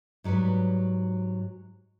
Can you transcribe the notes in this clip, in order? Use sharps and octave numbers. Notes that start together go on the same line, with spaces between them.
G#2 F#3 G3 B4 C#5